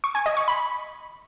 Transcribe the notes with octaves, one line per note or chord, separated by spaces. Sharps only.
C#6
G#5
D#5
C#6
B5